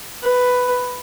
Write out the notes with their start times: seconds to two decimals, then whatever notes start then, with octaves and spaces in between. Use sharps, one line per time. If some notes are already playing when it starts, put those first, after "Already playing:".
0.23 B4